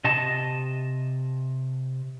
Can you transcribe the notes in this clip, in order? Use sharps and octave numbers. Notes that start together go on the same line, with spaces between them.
C3 D#5 A5